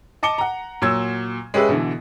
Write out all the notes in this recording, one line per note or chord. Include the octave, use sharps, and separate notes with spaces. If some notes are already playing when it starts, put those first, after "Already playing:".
D#5 A5 D6 C#7 G7
F#5 A#5
A#2 F#3 E6 G#6
G#3 C#4 G4 G#4 B4 E5
B2 D3 E3